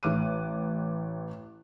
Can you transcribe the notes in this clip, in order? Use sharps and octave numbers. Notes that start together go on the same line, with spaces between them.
A1 D6 F#6 D#7